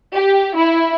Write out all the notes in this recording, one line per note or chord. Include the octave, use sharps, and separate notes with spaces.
G4
E4